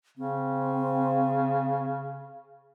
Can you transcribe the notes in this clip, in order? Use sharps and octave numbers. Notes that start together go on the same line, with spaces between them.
C#3 C4